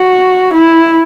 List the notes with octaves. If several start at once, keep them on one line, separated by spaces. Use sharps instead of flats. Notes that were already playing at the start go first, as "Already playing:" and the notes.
Already playing: F#4
E4